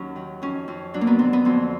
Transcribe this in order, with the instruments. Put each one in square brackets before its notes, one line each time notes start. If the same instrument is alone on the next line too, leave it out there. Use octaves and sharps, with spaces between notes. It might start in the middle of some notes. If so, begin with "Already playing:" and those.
Already playing: [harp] D#2 F#3 C#4
D#3
F2 C#4
F2
F#3 D4
A#3
B3
D3 C4
B3
F2 C4